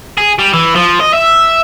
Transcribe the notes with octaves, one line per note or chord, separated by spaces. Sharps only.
G#4
G3
E3
F3
D#5
E5